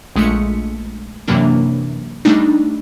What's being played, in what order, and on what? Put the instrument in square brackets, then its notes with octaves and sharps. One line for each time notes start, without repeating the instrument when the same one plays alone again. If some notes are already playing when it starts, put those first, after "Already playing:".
[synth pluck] A#1 G#3 A3 B6 C#7
F#2 C3 E3 F#3 A#3 D4
G3 A3 D4 D#4